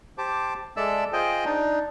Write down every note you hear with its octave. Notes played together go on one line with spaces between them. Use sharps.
G4 C5 A5 D6
G#3 A4 D5 E5 A5 E6
F4 G#4 C5 D#5 G5
D4 D#4